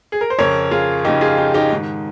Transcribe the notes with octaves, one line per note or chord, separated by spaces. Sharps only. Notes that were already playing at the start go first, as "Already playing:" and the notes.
G#4
A#4
C5
F2 C#3 A#4 C#5
F4 G#4
F2 C#3 D#4 G4
F4 G#4
D#4 G4
D#4 G4
G#2 D#3